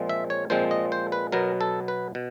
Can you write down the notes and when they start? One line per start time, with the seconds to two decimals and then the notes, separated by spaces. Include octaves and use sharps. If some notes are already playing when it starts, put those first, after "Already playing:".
Already playing: A#2 F3 G#3 C4
0.09 E5
0.30 C#5
0.50 A#2 F3 G#3 C4 C5
0.71 D#5
0.92 C5
1.12 B4
1.32 B2 F#3 B3 A#4
1.61 A4
1.88 B4
2.15 B2